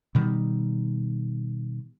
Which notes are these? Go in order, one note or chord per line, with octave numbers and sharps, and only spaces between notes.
B2 D#3 G3